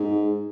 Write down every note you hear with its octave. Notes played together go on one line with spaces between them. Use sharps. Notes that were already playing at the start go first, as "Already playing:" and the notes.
Already playing: G#2